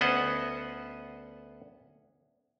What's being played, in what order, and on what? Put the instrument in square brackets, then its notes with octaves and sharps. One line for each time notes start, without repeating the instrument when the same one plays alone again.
[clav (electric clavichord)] D2 B3 C#4 C5 D#5 F#5